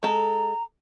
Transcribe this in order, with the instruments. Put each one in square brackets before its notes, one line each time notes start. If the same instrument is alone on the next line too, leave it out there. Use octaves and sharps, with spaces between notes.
[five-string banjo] G#3 A4 [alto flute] A#5